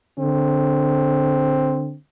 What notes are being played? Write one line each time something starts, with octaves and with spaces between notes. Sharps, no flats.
D3 C4